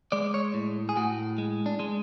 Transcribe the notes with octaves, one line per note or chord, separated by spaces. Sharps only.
G#3 D5
C#5
A2
G#4
A2 F#4
G#3
D4
G#3